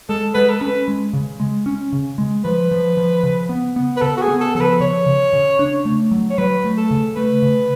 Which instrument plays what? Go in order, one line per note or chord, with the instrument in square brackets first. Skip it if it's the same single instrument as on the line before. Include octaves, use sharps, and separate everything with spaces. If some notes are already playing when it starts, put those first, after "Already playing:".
[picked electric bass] G#3 [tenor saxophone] A4
[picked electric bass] G#3 [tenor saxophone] B4
[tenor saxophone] A4
[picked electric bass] C#4 [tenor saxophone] B4
[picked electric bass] G#3
C#3
G#3
C#4
C#3
G#3
[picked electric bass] F3 [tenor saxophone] B4
[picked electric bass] F3
F3
C#3
B3
B3
[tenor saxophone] B4
[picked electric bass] C#3 [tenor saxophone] A4
[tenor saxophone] F#4
G#4
[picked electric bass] B3
[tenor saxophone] A4
[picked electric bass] F3 [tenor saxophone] A4
[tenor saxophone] B4
[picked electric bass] C#3 [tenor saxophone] C#5
[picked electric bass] C#3
C#3
D4
A3
F#3
[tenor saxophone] C#5
[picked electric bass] F#3 [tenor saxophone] B4
[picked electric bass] A3
[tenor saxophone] A4
[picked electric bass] C#3
[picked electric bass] A3 [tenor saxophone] B4
[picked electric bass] C#3